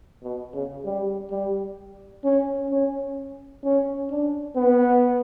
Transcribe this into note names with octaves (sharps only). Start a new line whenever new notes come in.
B2
C#3
G3
G3
C#4
C#4
C#4
D4
B3